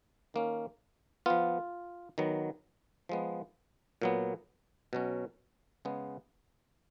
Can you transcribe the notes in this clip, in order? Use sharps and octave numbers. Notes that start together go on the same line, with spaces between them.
D#3 A#3 C#4
F3 B3 F4
D#3 F#3 B3
F3 G#3 B3
A#2 F#3 B3
B2 F#3 C#4
C#3 G#3 B3